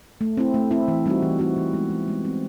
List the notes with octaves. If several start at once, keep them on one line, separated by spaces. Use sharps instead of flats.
A3
C4 E4
A3
C4 E4
E3
G3 C4 D#4 F#4
E3
G3 C4 D#4 F#4
E3
G#3 B3
E3
G#3 B3
C4